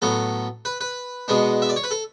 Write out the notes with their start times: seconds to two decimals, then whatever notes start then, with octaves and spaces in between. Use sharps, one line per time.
0.02 A2 F#3 B3 A4
0.65 B4
0.81 B4
1.28 B2 G#3 B3 D4
1.62 E5
1.69 D5
1.76 C#5
1.84 B4
1.91 A4